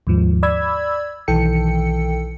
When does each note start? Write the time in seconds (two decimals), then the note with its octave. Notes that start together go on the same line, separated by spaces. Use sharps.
0.07 D#2 G#2 F3
0.43 D5 B5 E6 G#6
1.28 B1 D#3 E3 A4 G5 C#7